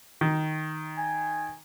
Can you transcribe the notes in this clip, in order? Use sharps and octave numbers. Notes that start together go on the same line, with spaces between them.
D#3
G#5